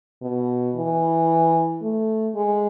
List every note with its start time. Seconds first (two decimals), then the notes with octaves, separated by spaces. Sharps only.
0.22 B2
0.75 E3
1.82 A3
2.35 G#3